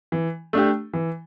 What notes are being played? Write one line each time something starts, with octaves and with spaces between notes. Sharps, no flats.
E3
A3 D4 G4
E3